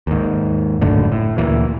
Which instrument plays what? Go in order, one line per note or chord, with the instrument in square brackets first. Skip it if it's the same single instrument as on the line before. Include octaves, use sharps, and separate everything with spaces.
[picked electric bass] D#2 G#2
F#1 F#2 A2 D3
A2
D2 A#2 E3